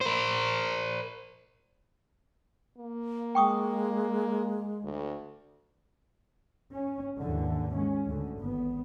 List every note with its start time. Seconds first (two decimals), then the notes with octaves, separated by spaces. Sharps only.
0.01 A#4 C5
2.78 A#3
3.35 G#3 G5 C#6 D#6
4.84 D2
6.73 C#4
7.20 D#2 G#2 D3 E3
7.75 G#3 C#4
8.05 D2 D3
8.39 G#1 B3